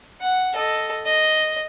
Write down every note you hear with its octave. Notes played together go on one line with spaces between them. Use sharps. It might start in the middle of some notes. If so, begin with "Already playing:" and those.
F#5
A4 D#5
D#5